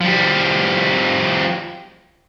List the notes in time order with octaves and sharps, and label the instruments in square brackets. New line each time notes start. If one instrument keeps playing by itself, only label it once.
[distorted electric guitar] F3 G3